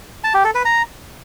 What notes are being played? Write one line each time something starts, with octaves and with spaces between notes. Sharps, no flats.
A5
G4
A4
B4
A#5